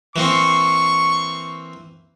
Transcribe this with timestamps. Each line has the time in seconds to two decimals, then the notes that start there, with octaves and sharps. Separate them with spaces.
0.16 E3 A#3 C4 C#6